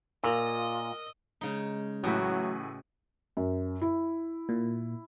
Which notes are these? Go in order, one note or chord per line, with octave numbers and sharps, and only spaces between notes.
A#2 F4 A#4 D#5 E6
C#3 G#3 D#4
A1 A2 F#3 E4 F#4 G4 B4
F#2
E4
A#2